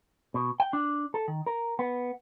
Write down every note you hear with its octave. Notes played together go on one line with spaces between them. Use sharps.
B2
G5
D4
A4
D#3
A#4
B3